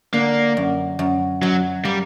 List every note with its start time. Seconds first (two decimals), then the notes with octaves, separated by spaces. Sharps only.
0.13 D3 A#3
0.57 F#2
0.99 F#2
1.42 F#2 F#3
1.85 G3 A#3